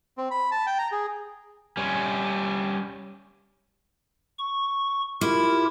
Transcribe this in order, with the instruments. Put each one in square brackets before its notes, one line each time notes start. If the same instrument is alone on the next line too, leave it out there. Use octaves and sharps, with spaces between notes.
[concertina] C4
B5
A5
G5
A#5
G#4
[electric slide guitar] G3 C#4
[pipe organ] C#6
[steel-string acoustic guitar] E4 [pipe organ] F4 G4 A#4